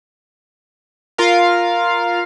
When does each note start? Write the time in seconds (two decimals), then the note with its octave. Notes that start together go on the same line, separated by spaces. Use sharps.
1.18 F4 A#4 F5